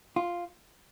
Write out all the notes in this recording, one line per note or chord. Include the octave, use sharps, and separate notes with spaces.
F4